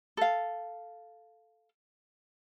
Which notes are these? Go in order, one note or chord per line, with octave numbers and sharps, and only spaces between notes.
A4 F5